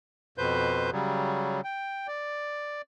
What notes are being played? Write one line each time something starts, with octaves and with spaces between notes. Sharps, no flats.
F2 B2 B4 C5 G6
C#3 F#3 G3
G5
D5